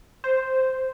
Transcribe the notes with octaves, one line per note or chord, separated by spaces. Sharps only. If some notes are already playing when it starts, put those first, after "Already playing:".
C5